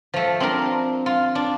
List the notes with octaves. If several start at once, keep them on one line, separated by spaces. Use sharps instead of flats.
F3 A3
C4 D4 A#4
F4
D4